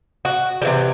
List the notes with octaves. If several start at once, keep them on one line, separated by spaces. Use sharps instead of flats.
F#4
G3
C3 E3